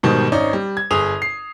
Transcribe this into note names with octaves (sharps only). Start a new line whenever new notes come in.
G#2 B2 D#3 G3
G#1 C#4 D#4 D5
G3
G#6
G1 G#4 D#6 F7
C7